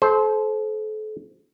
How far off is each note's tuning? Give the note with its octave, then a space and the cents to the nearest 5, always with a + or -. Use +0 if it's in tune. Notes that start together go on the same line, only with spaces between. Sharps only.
A4 -35 C5 +0